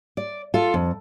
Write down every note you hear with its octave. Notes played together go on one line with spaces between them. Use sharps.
D5
F4 A4
F2